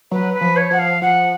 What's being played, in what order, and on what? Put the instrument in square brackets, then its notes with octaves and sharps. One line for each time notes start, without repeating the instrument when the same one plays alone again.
[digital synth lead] F#3 [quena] B4
[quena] B4
[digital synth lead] F3
[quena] C#5
[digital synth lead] F3 [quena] F#5
[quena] F5
[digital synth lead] F3 [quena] F#5